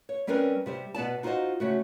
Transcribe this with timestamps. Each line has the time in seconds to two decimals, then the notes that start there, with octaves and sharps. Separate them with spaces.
0.09 C#5
0.27 G3 C4 C#4 A#4 B4 D5
0.66 C3 G3 C5
0.94 B2 B3 D5 A5
1.23 D#4 F4 F#4 B4 C5 D#5
1.60 C#3 A3 F#4